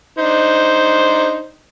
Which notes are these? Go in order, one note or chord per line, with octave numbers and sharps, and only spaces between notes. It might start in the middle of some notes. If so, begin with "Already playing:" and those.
D4 D#4 C5